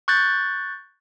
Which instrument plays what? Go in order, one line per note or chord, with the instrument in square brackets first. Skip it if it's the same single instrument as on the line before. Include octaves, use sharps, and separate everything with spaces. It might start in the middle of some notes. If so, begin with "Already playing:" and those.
[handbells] C#6 F#6 G6 A6